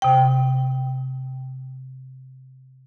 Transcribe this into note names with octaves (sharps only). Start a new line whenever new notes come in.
C3 G5